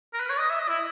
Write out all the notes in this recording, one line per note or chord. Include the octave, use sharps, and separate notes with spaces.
A#4
B4
C#5
D#5
E5
D#5
E4